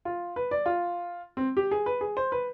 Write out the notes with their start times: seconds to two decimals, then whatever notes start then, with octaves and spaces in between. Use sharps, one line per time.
0.05 F4
0.36 B4
0.51 D5
0.66 F4
1.37 C4
1.57 G4
1.71 G#4
1.86 B4
2.01 G#4
2.17 C5
2.32 B4